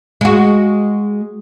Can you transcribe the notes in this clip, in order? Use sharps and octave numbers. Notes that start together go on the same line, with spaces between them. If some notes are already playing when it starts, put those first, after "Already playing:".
G#3 F#4